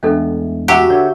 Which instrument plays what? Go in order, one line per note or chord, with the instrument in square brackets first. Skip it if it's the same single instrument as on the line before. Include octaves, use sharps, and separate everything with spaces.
[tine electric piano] E2 G#3 A3 [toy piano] C#4 D4 A4
[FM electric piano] F#4 E5 [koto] G4 [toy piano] G#5 A#5
[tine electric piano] D3 C#5 G6